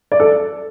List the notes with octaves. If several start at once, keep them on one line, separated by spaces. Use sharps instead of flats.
D5
A4